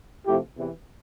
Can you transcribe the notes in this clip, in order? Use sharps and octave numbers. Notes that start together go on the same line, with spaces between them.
C3 F3 A3 E4 G4
E2 C3 E3